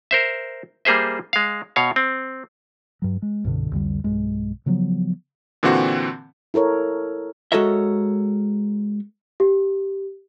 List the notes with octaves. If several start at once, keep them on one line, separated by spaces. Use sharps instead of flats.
A#4 C5 E5
G3 A#3 G#4 C5 E5
G#3 F5
B2 C#5 F5
C4
G2 F#3
G#3
C2 G2 B2 D3
C2 F2 D3 G3
B1 G2 G#3
C#3 F3 F#3 B3
A#2 D3 E3 C4 F#4
E4 A4 A#4 C#5
G#3 F#4 A4 A#4 C#5 E5
G4